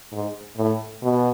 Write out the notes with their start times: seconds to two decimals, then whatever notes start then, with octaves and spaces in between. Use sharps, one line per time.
0.12 G#2
0.57 A2
1.03 B2